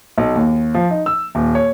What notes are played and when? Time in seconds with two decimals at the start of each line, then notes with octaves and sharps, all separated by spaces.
0.18 B1
0.35 D#2
0.74 F3
0.90 D#4
1.06 E6
1.35 D#1
1.55 C#5